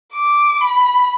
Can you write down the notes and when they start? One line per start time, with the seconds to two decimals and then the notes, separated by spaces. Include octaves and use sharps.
0.13 D6
0.61 B5